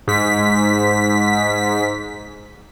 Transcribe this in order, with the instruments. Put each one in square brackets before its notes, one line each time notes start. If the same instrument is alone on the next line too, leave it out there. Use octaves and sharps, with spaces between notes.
[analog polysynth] G#2 B6